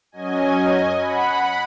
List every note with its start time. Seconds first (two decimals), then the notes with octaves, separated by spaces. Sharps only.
0.12 F#2 F#3 C#4 D#5 G#5
0.99 F#5 B5